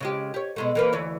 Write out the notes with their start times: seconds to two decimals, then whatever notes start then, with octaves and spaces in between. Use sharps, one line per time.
0.01 C#3 G#3 G4
0.34 G4 C#5
0.56 B2 G#3 A3
0.75 E3 A#3 B4
0.93 D2 E3 C#5